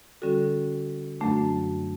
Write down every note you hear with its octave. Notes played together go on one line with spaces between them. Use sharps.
D3 G3 C#4 F#4 A4
F#2 D3 F#3 A3 D4